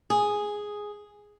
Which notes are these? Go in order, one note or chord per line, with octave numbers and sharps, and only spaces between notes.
G#4